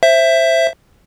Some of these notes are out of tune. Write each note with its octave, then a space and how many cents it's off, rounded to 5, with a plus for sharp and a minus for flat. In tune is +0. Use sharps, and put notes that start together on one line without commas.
C5 +15 E5 +10